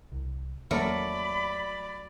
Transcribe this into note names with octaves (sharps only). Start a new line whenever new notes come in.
C2
E2 F#3 A3 A#3 A#4 D5 B5